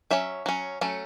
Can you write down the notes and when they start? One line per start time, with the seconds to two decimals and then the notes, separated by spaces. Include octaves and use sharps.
0.11 F#3 C#4 E5
0.46 F#3 C#4
0.81 F#3 A3 C#4